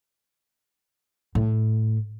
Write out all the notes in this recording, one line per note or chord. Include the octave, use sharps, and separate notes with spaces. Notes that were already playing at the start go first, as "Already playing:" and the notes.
A2